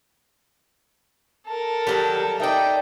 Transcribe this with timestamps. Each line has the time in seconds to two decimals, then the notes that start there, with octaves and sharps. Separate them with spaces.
1.47 A4 A#4 A5
1.87 D#3 F#3 G3
2.40 D#4 D5 E5 G5